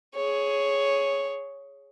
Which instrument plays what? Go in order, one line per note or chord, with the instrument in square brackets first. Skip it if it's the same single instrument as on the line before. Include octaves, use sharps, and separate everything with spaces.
[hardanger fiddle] G#4 C#5